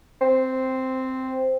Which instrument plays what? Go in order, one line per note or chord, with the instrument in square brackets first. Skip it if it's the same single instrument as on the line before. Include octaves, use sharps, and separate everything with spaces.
[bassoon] C4